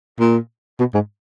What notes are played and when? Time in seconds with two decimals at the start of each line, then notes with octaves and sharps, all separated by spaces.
0.20 A#2
0.79 B2
0.94 G#2